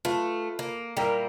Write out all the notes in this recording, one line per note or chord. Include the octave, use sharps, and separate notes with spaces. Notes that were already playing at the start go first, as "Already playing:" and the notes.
A3 F4 B4
A#3
A#2 G3 A#3 E4 A#4